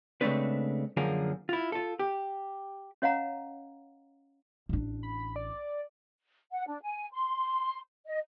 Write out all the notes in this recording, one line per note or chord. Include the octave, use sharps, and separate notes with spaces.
C#3 G#3 A3 C4 D4 B4
F#2 D3 F3 A#3 G#4 A#4
E4 F4
F4 A4
G4
C#4 C#5 D#5 F5 F#5 A#5
A1 D4
B5
D5
F#5
D4
G#5
C6
D#5